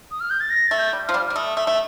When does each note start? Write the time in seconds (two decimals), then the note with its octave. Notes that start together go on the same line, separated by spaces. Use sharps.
0.11 D#6
0.20 F6
0.30 G6
0.40 A6
0.50 A#6
0.67 A3 A6
0.78 G6
0.93 G3
1.07 F3 F6
1.14 G3
1.26 F6
1.30 G3
1.36 A3 D#6
1.57 A3
1.67 A3